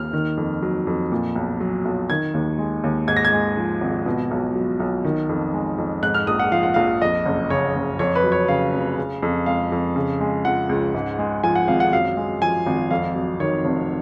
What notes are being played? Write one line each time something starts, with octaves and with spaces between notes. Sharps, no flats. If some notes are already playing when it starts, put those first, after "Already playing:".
Already playing: D#2 F6
D#3
F2
F#3
F2
A#2
B1
F#3
B1
D#3 G#6
D#2
G#3
D#2
G#2 G#6
A#6
G#6
G#3
F3
G#1
B2
B1
F#3
B1
D#3
F2
G#3
F2
G#2 F#6
F6
A#1 D#6
F#5
F3 F5
F#5
A#1 F5
F2 D#5
F#1
C#3 C#5
F#1
F2 C#5
B4
F#3
C#5
C#3 F5
F1
C#3
F2
G#3 F5
F2
C#3
G#3
F3 F#5
C#2
G#2
G#3
F3 G#5
F#5
G#1 F5
F#5
F#2 F5
G#3
F3 G#5
G#1
F2 F5
F#3
D#3 C#5
F1